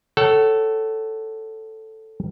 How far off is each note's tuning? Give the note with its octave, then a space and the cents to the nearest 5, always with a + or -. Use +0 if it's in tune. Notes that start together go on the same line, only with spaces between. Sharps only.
A4 +0 C#5 +0 F#5 +40